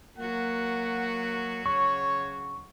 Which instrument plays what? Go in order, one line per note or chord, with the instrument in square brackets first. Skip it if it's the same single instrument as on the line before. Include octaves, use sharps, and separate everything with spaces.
[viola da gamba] F#3 F#4 [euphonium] A#3 [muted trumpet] F#5
[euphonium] C#3 [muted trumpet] C#5 [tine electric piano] C#6